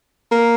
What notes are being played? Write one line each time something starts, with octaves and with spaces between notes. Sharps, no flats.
A#3